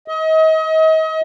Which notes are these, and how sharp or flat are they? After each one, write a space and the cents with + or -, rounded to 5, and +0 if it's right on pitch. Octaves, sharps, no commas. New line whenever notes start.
D#5 +35